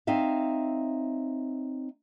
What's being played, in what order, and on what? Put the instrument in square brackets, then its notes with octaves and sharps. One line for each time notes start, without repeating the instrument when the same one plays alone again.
[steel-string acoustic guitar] C4 D#4 C#5 E5 F5